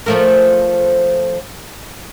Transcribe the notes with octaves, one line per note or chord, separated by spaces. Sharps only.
F3 A3 A#4